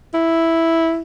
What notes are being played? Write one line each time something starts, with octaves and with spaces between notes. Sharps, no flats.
E4